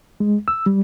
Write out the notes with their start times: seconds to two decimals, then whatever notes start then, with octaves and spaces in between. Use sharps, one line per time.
0.20 G#3
0.48 E6
0.66 G3